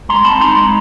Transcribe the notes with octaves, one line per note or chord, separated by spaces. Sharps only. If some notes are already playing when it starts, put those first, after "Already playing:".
G#3 A#5 C6
C4 A5 B5
D#4 A#5 C6
G#3